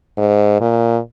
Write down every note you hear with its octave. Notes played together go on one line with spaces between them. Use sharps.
G#2
A#2